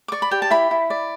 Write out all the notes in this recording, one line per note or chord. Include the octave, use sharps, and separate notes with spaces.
D6
D5 C#6
B5
G4 G5
A5
E4 B5
E4
D5